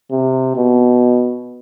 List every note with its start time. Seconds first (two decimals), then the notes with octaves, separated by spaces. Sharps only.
0.11 C3
0.56 B2